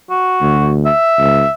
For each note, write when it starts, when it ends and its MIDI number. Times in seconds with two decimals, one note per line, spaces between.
0.10 0.71 66
0.41 0.88 38
0.86 1.52 76
1.18 1.43 37